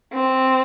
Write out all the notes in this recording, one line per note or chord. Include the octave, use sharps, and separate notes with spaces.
C4